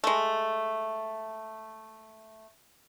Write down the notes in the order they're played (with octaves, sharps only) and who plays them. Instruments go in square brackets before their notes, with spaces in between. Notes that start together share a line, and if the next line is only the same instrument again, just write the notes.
[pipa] G#3 A3